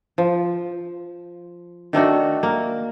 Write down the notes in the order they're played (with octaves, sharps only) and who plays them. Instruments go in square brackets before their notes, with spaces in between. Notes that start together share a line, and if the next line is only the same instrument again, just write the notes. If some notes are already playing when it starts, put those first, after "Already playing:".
[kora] F3
D#3 A3 D4 F#4
A#3